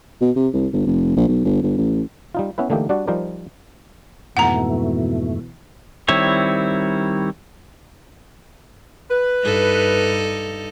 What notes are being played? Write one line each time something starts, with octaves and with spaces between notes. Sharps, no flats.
B2
C3
C2
G1
F1
A#1
B1
G1
G1
A1
G3 D#4 F4
B3 C#4 E4 B4
D3 E3 A3 A#3 D#4 G4
G3 D4 F#4 D5
F3 G3 D#4 A#4 C5 D5
F2 G#2 B2 E3 A3 F#5 A#5
D#3 G3 C4 E4 C#5
B4
G2 D#4 A4